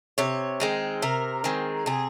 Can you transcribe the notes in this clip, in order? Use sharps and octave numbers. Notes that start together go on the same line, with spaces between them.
C3 C#5
D#3 G#3 C4
C3 A#4
D#3 G#3 C4
C3 G#4